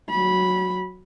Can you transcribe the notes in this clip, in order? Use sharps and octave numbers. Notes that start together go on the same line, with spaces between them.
F#3 B5